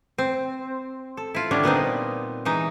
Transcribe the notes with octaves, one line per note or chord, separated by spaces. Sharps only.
C4
A4
E4 F4
D3 G3 D4 C#5
A#2 B3 C4 D#4
E3 G#3 D#4